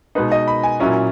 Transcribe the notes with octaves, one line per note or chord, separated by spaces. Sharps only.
B2 G#3 D#4 B4
D#5
B5
G#5
A#2 F#3 C#4 E4